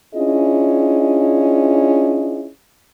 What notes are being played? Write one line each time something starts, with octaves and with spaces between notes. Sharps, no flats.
C#4 D4 E4 F4 G#4 D#5